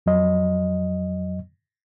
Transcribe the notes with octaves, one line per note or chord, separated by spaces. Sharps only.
F2 F#3 D#5